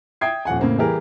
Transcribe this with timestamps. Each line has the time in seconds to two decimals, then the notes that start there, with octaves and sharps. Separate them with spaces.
0.21 E5 G5 D#6 G#6 C7
0.45 D#1 F3 F#5 G#5
0.60 A2 C#3 A#3 C4
0.78 E3 G3 G4 G#4 A#4